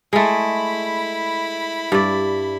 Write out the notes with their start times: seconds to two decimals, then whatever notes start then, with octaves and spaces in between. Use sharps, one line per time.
0.13 G#3 A3 E4 B5
1.92 G2 D5